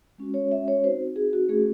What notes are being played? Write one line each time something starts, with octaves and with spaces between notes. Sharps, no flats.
G#3 C#4 F#4
C#5
E5
C#5
C4 D#4 F#4 C5
G#4
F#4
A3 C#4 F#4 G#4